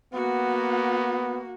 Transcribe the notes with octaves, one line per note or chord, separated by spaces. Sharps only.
A#3 B3 F#4